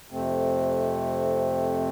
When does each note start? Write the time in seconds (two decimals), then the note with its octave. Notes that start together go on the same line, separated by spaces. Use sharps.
0.09 F2 C3 A3 C4